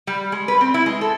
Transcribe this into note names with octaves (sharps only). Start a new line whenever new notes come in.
G3
G#3
B4
C4
E4
G#3
A4